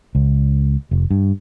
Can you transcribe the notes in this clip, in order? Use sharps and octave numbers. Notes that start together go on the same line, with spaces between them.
C#2
F1
G2